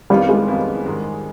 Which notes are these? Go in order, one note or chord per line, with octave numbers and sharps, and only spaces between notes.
F2 D#3 G3 B3 F4
G#3
F2 D#3 B3 F4
G#2 D#3 G#3